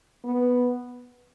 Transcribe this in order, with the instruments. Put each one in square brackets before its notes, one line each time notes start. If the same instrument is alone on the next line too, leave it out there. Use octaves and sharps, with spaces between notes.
[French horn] B3